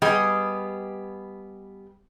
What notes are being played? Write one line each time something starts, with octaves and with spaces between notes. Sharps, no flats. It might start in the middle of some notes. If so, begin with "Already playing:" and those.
G3 B3 G4 G#4 D#5